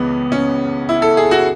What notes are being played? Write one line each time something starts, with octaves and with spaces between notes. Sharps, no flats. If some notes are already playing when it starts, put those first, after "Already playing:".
Already playing: C#2 C#3 E3 B3
C#4
E4
A4
G#4
F#4